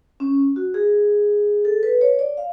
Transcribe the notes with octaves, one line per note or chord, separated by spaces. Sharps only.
C#4
F#4
G#4
A4
B4
C#5
D5
F5